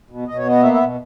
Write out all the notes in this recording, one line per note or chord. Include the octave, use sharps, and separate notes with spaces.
B2
B2 D#5
C#5
B3 D#5
A#3 E5
E5
B2